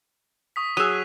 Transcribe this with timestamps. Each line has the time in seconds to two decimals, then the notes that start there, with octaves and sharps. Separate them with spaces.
0.56 C#6 D#6 B6
0.77 F#3 G#4 D#6 E6 F#6 D#7 F7